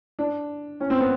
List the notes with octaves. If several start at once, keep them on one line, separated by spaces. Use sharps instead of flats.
D4
C#4
C4
B3